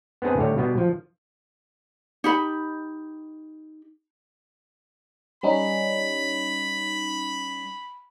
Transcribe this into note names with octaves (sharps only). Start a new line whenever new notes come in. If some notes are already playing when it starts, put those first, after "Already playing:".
B3 C4 D4 G#4 B4
A2 D3 G3 C#5
B2 G3 B3
F3
D#4 G4 B5
G3 C#4 D#4 B5